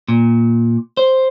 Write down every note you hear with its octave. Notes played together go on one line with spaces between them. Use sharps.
A#2
C5